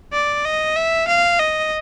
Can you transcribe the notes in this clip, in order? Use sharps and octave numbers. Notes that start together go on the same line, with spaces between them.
D5
D#5
E5
F5
D#5